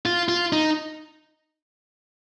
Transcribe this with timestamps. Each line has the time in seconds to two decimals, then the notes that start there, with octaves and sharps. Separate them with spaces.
0.05 F4
0.29 F4
0.53 D#4